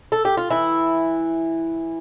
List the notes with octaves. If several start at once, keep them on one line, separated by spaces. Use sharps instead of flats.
A4
G4
F4
E3 E4